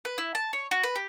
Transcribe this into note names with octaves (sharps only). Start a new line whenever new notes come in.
B4
E4
A5
C#5
F#4
B4
G4